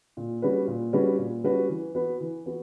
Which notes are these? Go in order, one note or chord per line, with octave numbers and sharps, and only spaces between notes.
A#2
G3 C#4 F#4 B4
A#2
G3 C#4 F#4 B4
A#2
G3 C#4 F#4 B4
E3
B3 F#4 B4
E3
B3 F#4